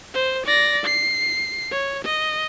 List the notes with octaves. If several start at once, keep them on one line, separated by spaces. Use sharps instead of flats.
C5
D5 A#6
C7
C#5
D#5